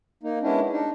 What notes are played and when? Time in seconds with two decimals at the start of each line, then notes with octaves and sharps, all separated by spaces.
0.23 A#3 D#4
0.42 G#3 B3 C#4 D4 E4
0.71 D4 D#4